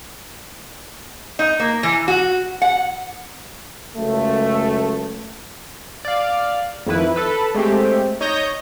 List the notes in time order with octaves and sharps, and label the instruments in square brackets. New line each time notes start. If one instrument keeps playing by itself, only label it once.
[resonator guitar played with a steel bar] D#4
A#3
E3
F#4
F#5
[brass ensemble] C#2 F#2 A3
[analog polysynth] D5 F5
F2 D#3 E4 B4
A4 B4
G#3 A3 C4 G4
D#4 C#5 D#5 G6 A#6